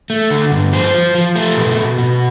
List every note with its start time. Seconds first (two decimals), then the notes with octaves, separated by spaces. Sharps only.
0.10 A3
0.30 D3
0.52 G2
0.73 F3 C5
0.94 F3
1.15 F3
1.36 A3
1.56 B2
1.77 B2
1.98 B2